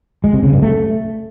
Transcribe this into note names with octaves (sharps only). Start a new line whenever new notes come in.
G#3
C3
C#3
G2
A3